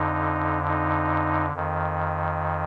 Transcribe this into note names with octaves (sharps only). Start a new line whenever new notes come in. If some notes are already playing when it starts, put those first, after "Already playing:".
Already playing: F2 D3 D#4
D#4
F2 D#3